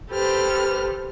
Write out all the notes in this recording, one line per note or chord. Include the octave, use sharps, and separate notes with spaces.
G4 A4 B4 C5 F6